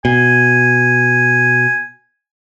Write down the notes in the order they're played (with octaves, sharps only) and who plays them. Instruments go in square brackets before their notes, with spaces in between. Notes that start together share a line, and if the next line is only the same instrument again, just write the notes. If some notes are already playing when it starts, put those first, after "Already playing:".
[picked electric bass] B2 [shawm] G#5